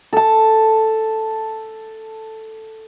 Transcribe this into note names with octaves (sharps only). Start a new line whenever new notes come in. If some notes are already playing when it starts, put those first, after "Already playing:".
A4 A5